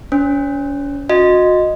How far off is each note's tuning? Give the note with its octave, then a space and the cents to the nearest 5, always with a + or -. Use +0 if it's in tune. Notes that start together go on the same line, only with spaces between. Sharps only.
C#4 +40 C5 +0
F#4 -30 D#5 +0